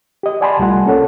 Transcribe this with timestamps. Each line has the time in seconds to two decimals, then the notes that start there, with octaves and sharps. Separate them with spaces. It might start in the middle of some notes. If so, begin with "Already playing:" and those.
0.23 G4 D#5
0.41 D5 F#5 G#5 A5 B5 C6
0.59 C2 G3 A3 F4 F#5
0.86 A#3 C#4 A4 C#5 F#5